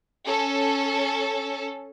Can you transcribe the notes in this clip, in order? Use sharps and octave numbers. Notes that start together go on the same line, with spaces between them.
C#4 A4